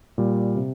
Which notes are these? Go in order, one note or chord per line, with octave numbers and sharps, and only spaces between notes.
A#2 G3
C3